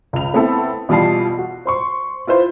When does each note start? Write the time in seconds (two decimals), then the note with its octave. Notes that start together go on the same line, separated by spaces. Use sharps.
0.13 C#2 F7
0.33 A3 B3 C4 E4 A4
0.89 B2 E3 G3 F4 A5 C7
1.38 F#4
1.66 C5 C6 C#6
2.27 E4 F4 B4 C5